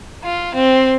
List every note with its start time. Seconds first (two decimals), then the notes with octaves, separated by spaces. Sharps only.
0.23 F4
0.55 C4